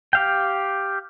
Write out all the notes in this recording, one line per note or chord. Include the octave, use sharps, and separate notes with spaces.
G4 F5 G5